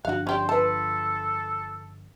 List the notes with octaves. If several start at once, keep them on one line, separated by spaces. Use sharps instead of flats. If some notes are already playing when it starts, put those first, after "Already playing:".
G1 F3 D4 F#4 F5 F#5
C#4 G4 C5 D5
F4 A4 B4 A5